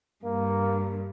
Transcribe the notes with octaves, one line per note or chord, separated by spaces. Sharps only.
G2 A#3